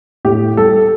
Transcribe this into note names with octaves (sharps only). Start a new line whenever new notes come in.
A2 G4
G3 A4